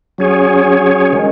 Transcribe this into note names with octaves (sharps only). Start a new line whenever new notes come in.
F#3 C#4 G#4 C#5
D#3 G#3 C#4